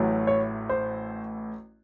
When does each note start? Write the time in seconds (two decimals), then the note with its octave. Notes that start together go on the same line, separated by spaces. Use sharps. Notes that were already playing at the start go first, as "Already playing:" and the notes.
Already playing: A1 A2 F#3 A3
0.27 C#5
0.69 C5